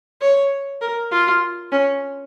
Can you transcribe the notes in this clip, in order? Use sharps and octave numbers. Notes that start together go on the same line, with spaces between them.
C#5
A#4
F4
C#4